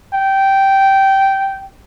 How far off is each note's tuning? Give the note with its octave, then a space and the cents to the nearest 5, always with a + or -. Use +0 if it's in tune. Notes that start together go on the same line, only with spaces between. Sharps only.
G5 -10